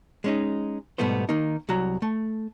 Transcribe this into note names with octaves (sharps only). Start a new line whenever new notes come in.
G#3 C#4 D#4
G#2 B2 G3 A3 B3 C5
D#3 A#3 D#4
C2 F#3 F#4 A#5
A3